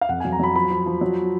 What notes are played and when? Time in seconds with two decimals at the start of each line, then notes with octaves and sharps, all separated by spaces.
0.01 F5
0.09 F2 F#5
0.20 G#5
0.25 F#3
0.32 A#5
0.39 F#3 B5
0.55 F3 B5
0.70 F3
0.86 F3
1.01 F#3